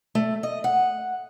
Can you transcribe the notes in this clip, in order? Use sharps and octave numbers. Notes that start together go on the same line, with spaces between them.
A3
D#5
F#5